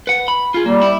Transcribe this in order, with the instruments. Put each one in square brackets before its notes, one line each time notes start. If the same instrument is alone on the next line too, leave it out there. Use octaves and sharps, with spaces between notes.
[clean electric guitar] B4 F#5
B5
F4 G#4
[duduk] G3 [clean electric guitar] A#3
[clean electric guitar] E4